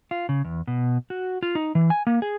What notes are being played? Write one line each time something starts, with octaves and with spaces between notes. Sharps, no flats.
F4
C#3
E2
B2
F#4
F4
D#4
E3
G#5
A#3
G#4